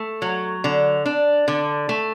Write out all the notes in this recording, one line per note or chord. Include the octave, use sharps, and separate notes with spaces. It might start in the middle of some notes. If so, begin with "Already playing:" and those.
Already playing: A3
F#3
D3
D4
D3
A3